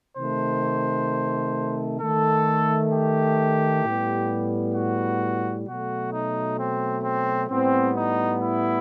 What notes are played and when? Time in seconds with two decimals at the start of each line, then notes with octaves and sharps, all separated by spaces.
0.17 C3 D#3 A3 C5
2.01 D#3 A3 A4
2.92 G4
3.84 A2 G3 B3
4.75 F#4
5.67 B2 F#3 A3 F#4
6.13 D#4
6.58 C4
7.04 C4
7.50 A2 G3 B3 C4
7.96 D#4
8.41 E4